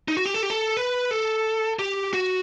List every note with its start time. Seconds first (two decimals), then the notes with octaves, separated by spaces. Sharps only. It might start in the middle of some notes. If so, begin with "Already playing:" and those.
0.08 D#4
0.17 F#4
0.25 G4
0.34 A4
0.43 G4
0.50 A4
0.77 B4
1.11 A4
1.79 G4
2.14 F#4